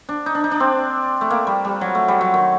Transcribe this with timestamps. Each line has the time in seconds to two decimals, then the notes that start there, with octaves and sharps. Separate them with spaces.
0.09 D4
0.26 D#4
0.35 D4
0.44 D#4
0.51 D4
0.60 C4
1.21 A3
1.30 A#3
1.47 G3
1.65 G3
1.81 F#3
1.95 A3
2.08 G3
2.21 F#3
2.34 D#3